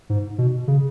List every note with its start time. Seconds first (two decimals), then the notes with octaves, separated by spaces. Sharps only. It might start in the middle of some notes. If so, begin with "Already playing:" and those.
0.10 G#2
0.38 B2
0.68 C#3